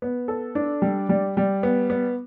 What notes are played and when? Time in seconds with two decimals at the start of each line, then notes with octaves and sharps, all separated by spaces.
0.02 B3
0.28 A4
0.55 D4
0.82 G3
1.09 G3
1.37 G3
1.63 B3
1.90 B3